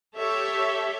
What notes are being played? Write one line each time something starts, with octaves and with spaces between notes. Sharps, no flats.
G4 A4 C#5 E5